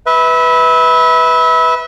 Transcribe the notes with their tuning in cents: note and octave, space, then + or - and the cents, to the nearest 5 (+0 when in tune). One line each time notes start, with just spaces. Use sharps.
B4 +0 E5 -30